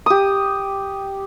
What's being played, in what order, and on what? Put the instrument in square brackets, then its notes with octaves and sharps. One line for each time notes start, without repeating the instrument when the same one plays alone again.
[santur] G4 D#6